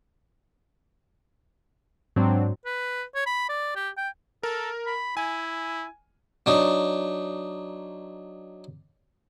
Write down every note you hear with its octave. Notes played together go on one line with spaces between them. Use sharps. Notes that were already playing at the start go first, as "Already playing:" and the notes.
G#2 F#3 C4 D4
B4
C#5
B5
D5
G4
G5
A4 A#4
B5
E4 G#5
F#3 D4 D#4